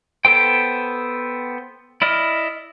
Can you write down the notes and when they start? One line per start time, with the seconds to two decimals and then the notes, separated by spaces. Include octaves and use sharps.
0.25 B3 A4 C5 G5
2.02 E4 D5 D#5 F6